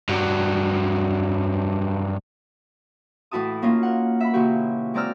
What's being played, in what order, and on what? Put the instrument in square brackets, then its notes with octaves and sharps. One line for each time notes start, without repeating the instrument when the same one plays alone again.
[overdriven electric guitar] G2 F#3
[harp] A2 E3 E4 F#4 A5 D#6
A#3 C#4 D#4 F4
A#4 F#5
E5 B5
A#2 C#3 E3 A#3 F#4 G4
G#3 C4 D5 A#5 E6 F6